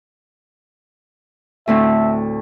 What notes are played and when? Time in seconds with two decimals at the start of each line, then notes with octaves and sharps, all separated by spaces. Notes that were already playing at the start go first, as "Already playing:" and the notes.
1.68 D2 A2 C4 E5